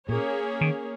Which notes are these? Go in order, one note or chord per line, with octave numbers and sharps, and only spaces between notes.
A#2 A#3 C#4 G#4 C#5
D#3